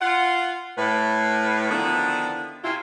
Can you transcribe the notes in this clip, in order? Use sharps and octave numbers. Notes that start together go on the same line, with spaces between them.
F4 F#5
A2 B4
D3 D#3 F3 B3 D4 E4
C3 C4 C#4 E4 F4